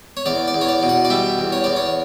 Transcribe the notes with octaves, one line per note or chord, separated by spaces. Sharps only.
C#5
E2 D5
D5
E2
C#5
D5
B2
F#5
D5
G3 E5
E2
C#5
E2 D5
C#5